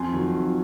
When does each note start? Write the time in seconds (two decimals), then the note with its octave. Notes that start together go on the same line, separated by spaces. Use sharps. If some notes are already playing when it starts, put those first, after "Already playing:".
Already playing: F2 G#5 C6
0.13 D#3 F#3
0.34 F2